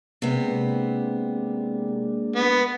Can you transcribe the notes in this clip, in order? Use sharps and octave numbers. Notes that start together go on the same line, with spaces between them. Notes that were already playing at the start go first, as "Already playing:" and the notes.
C3 G#3 A#3 B3 D4
B3